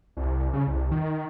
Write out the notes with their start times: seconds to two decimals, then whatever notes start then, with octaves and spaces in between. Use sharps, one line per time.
0.17 C2
0.53 C#3
0.67 C2
0.92 D#3